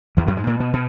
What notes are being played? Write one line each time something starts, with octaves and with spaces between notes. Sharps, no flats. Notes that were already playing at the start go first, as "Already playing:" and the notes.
E2 E3
F#2 F#3
G#2 G#3
A#2 A#3
B2 B3
B2